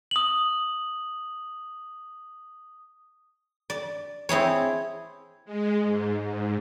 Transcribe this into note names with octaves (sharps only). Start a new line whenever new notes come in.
D#6 F#7
D5
C4 E4 G#4 C#5
G#3
G#2
G#2